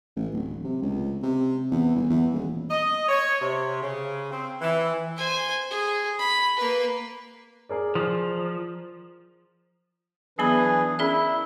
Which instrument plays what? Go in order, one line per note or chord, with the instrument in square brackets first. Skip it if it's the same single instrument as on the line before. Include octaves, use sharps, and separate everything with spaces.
[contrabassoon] A1
D1
C3
C#2
C3
E2
G1
E2
D#1
[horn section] D#5
C#5
C3
C#3
C4
E3
[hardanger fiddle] C5 G#5
G#4
B5
A#3 B4
[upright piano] G#4 A#4 D5
[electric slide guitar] F3
[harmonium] E3 D4 B4 [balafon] F#3 B3 B5 [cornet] G#4
[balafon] C#4 G#4 D5 [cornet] E4 [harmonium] A#4